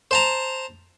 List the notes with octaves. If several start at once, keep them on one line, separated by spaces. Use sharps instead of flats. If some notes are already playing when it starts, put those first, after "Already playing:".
C5 A5 A#5